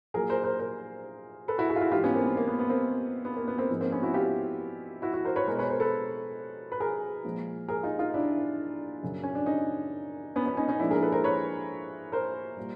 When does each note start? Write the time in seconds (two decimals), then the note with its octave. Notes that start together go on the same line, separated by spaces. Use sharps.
0.14 A#2 F#3 G#4 A#4
0.29 A#4 C5
0.44 A#4 C5
0.59 A#4 C5
1.48 A4 B4
1.58 E4 F#4
1.69 F#4 G#4
1.76 F4
1.81 E4 F#4
1.91 G#2 E3 G#3 F4 G4
2.04 B3 C#4
2.14 A#3 C4
2.25 B3
2.37 A#3
2.48 B3
2.59 B3
2.70 A#3 C4
3.25 B3
3.37 A#3
3.48 B3
3.58 A#3 C4
3.70 G#2 F3 G#3
3.81 A#3 C4
3.92 B3 C#4
4.03 E4 F#4
4.14 F4 G4
5.02 E4 F#4
5.13 E4 F#4
5.25 A#4 C5
5.36 B4 C#5
5.47 B2 G#3 A#4 C5
5.59 B4 C#5
5.70 A#4 C5
5.80 A4 B4
6.72 B4
6.80 G#4 A#4
7.24 A#2 F3 G#3
7.68 G#4 A#4
7.83 D#4 F4
7.99 D#4 F4
8.14 D4 E4
9.03 F#2 C#3 F#3
9.24 C#4
9.35 D4
9.46 C#4 D#4
10.36 B3 C#4
10.46 B3 C#4
10.57 C#4 D#4
10.69 C#4 D#4
10.79 A#2 F3 G#3 D4 E4
10.91 G#4 A#4
11.01 A4 B4
11.12 A#4 C5
11.24 B4 C#5
12.12 A#4 C5
12.57 A#2 G3